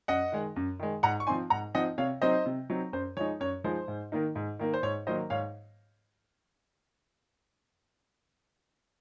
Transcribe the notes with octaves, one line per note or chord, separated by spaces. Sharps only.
F#2 D#5 F#5
D#3 G#3
F#2
D#3 G#3
G#2 F#5 A#5
C#6
F3 C4 D#4 G#5 C6
G#2 F#5 A#5
F3 C4 D#4 D#5 F#5
C3 C#5 F5
F#3 C4 D#4 C5 D#5
C3
F#3 C4 D#4
F#2 C5
F3 G#3 D#4 C#5
F#2 C#5
F3 G#3 D#4 C5
G#2
D#3 A#3 D#4
G#2
D#3 A#3 D#4
C5
G#2 C#5
D#3 F#3 A#3 C5 D#5
G#2 C#5 F5